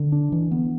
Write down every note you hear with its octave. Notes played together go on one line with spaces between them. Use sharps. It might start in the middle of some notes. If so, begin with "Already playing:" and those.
Already playing: D3
D4
E3
B3